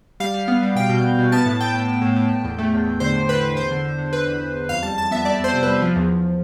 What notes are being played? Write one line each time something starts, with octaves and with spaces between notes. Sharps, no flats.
G3 F5
G3
B3
G3
B2 G5
B2
B2
B2
B3 A5
A2
A2 G5
A2
A2
A2
A2
A2
E2
A3
E2
E2
D3 C5
E2
D3 B4
E2
E2 C5
D3
D3
D3
D3 B4
E2
E2
E2
F2 F5
G3 A5
F2 A5
B3 E5
G3 D5
F2 C5
C3
G3 B4
F3
E2
E2